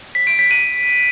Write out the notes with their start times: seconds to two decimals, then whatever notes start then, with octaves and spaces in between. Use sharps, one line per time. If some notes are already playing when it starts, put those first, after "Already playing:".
0.15 B6
0.27 D7
0.39 B6
0.51 D#7